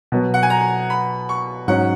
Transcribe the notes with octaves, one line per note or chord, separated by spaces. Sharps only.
B2 F#3 B3
F#5
G#5
A#5
B5
C#6
G#2 F#3 C#4 F#5